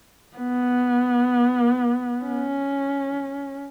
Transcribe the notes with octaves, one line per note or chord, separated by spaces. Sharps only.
B3
C#4